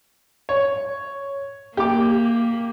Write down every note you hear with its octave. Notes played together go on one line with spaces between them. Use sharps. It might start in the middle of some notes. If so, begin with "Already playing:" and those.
C#5
A#3 G4 D6